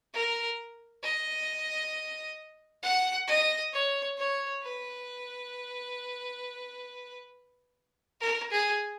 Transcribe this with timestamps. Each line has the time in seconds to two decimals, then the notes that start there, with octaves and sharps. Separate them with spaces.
0.14 A#4
1.03 D#5
2.83 F#5
3.28 D#5
3.73 C#5
4.17 C#5
4.63 B4
8.21 A#4
8.51 G#4